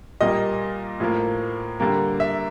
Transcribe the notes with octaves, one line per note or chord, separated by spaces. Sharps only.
A#2 G3 A#3 D#5
A2 F3 A#3
D3 G3 A#3
E5